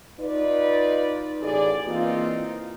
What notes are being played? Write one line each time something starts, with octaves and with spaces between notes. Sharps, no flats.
D#4 F4 B4 D5
A1 B2 G#4 D5
E3 A#3 C4 D#4 F4